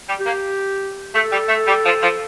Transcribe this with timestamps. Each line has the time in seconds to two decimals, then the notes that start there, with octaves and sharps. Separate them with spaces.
0.08 G3
0.20 G4
0.26 A#3
1.14 A3 A4
1.32 G3
1.49 A3
1.67 G3
1.85 F3
2.02 F3